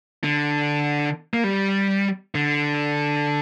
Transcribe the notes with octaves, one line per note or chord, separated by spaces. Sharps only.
D3
A#3
G3
D3